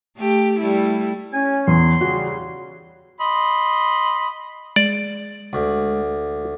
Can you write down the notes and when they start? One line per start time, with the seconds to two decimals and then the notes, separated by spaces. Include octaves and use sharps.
0.17 A3 G4
0.59 G3 A3 E4
1.33 C#4 G#5
1.67 E2 C6
2.01 C#3 G3 F#4
3.21 D#5 B5 C6
4.76 G#3 D5
5.53 D2